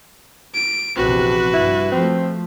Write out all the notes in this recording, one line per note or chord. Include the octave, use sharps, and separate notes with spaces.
D7
A#1 E2 C3 C4 F#4 B4
G2 E4
F3 A3 C4